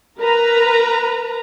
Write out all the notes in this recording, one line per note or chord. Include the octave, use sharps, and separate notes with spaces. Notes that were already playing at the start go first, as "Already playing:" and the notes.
A#4 B4 A#5